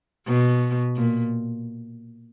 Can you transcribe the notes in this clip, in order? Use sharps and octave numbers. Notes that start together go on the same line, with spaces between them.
B2
A#2